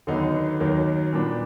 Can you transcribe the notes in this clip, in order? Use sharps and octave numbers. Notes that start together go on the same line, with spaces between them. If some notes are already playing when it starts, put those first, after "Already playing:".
D#2 D3 F#3 B3 D#4
D#2 D#3 F#3 A#3
A#2 G3 B3 D4